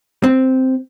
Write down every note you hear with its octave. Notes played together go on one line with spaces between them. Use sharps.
C4